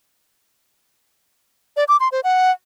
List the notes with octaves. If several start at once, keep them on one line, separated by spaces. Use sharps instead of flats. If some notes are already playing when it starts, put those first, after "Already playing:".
D5
D6
C6
C5
F#5